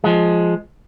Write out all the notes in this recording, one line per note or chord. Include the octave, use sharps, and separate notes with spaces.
F3 G#3